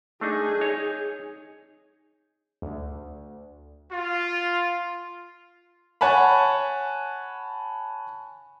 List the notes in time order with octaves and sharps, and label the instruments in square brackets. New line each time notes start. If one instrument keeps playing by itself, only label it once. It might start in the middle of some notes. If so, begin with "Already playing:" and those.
[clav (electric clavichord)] A3 D4 D#4 [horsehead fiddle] G#4
[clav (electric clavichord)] D#4 C#5
[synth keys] D2
[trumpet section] F4
[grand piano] C#5 F#5 G#5 A5 B5